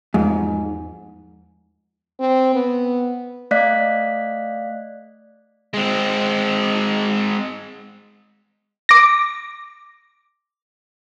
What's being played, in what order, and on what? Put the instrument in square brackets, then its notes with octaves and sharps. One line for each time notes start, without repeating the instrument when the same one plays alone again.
[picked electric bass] E2 F3 G#3 [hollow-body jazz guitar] G#2
[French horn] C4
B3
[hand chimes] A3 D5 D#5 F5 F#6 B6
[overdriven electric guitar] G#3 C4
[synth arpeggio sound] D6 A#6